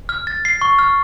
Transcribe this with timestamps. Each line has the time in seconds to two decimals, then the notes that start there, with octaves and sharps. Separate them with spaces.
0.09 F6
0.27 A6
0.45 C7
0.61 C#6
0.79 F6